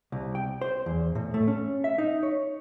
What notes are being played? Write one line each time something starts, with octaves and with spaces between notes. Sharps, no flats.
C2
G5
C5
E2
A2
A3
C#4
E5
D#4
C#5